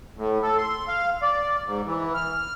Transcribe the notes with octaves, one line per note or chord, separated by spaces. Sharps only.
A2
A4
C6
F5
D5
G#2
E3
F6